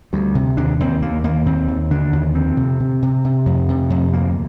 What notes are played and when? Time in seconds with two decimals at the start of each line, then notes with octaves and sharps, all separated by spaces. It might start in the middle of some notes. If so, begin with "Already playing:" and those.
0.13 D2 G3
0.35 C3
0.57 D#2 D4
0.80 D#2 C4
1.02 D#2 A#3
1.24 D#2 A#3
1.46 D#2 C4
1.68 D#2
1.91 D3 D4
2.13 D#2
2.35 F2 C4
2.57 C3
2.80 C3
3.02 C3
3.25 C3
3.46 F2
3.69 C3
3.90 F2
4.12 D2 A#3